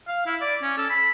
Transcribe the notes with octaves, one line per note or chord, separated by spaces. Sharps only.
F5
E4
D5
C#4
A4
B5